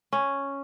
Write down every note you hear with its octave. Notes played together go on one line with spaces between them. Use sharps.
C#4